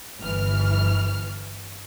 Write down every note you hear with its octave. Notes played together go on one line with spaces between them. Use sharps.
G1 E3 F6